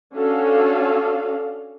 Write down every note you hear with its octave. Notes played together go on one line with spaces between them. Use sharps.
C#4 D4 F#4 A4 F5